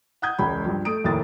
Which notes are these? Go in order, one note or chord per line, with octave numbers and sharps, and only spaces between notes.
F#5 D#6 G6 G#6
E1 C#2 C#3 B5
G2 F3
A3 D#6 D7
F1 D#2 A2 A#3 D#6 A6